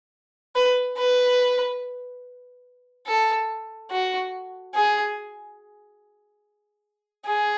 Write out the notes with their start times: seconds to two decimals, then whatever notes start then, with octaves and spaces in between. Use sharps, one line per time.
0.55 B4
0.97 B4
3.07 A4
3.91 F#4
4.75 G#4
7.26 G#4